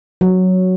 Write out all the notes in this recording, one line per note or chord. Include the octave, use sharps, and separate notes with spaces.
F#3